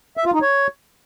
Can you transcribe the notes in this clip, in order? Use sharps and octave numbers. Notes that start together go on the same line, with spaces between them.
E5
F4
D#4
C#5